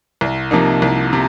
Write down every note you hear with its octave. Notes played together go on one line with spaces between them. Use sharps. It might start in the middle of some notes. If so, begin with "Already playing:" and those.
C2
C3 F3 A#3 D#4
C2
C3